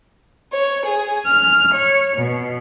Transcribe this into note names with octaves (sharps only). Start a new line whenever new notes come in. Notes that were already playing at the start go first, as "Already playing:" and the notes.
C#5
G#4
F6
C#5
B2